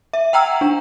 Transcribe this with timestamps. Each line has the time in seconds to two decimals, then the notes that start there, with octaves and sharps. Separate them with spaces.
0.13 E5
0.33 F#5 G5 A#5 E6
0.61 D4